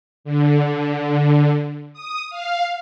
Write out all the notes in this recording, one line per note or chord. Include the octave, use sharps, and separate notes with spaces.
D3
D#6
F5